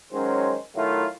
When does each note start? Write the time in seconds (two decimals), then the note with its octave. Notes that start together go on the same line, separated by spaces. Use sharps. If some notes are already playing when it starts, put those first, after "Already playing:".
0.13 D#3 F#3 G#3 C#4 C5
0.76 D#3 F#3 A3 E4 F4